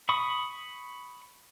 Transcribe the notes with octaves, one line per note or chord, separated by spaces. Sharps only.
B5 C#6 D#6